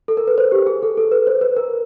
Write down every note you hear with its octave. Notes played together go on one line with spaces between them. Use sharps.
A4
A#4
B4
C5
G4
G#4
A4
A4
B4
C5
B4
A#4